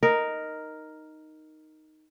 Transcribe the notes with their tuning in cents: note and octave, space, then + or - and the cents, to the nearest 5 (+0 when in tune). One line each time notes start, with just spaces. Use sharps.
D#4 +0 A#4 +0